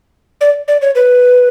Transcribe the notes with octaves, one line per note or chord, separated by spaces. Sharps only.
D5
D5
C#5
B4